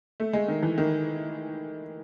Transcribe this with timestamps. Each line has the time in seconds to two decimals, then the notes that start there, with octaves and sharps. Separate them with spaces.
0.20 A3
0.33 G#3
0.48 D#3
0.63 E3
0.78 D#3